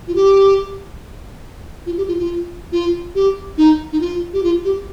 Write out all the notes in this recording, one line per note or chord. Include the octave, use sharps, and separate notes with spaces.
F4
G4
F4
G4
F4
F4
F4
G4
D#4
D#4
F4
G4
F4
G4